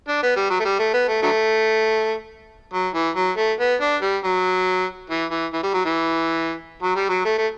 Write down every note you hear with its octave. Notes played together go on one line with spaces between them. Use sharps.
D4
B3
G3
F#3
A3
G3
A3
B3
A3
D3 F#3 A3
F#3
E3
F#3
A3
B3
D4
G3
F#3
E3
E3
E3
G3
F#3
E3
F#3
G3
F#3
A3
A3